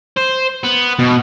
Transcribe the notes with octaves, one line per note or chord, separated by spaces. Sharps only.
C5
B3
B2